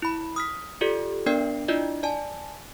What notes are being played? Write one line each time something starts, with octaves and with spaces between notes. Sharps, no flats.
E4 B5
D#6 F6 B6
F4 G4 A4 D5
B3 D4 A#4 D5 G5 C7
D4 E4 F4 D5 D#5
D5 G#5 A5